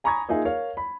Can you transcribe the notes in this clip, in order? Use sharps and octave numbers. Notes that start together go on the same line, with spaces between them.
G#5 A#5 B5 C#6 D#6 G#6
A#3 D#4 F4 G#4 E5
A#4 C#5 F5
B5